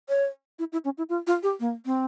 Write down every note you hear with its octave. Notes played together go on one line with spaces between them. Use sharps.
C#5
E4
E4
C#4
E4
F4
F4
G4
A#3
C4